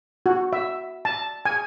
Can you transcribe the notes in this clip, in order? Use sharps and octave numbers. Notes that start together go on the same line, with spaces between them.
F#4
E5
A5
G#5